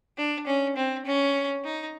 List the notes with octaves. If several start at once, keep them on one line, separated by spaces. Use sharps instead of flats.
D4
C#4
C4
C#4
D#4